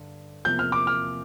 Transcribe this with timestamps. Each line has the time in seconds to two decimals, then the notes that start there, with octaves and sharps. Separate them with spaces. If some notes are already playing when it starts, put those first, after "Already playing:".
Already playing: G2 D3
0.45 E2 C3 F3 A#3 G6
0.59 F6
0.72 D6
0.87 F6